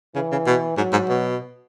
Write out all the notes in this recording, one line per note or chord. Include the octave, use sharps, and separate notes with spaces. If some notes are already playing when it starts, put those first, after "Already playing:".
C#3 E3
C#3
B2
G#2 F#3
G#2
B2